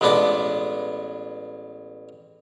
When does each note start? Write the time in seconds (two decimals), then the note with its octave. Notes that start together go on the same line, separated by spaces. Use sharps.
0.01 A1 G#3 B3 D4 B4 D6